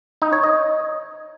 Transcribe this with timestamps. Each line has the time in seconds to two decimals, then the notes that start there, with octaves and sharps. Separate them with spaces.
0.22 D#4
0.33 C#5
0.44 D#5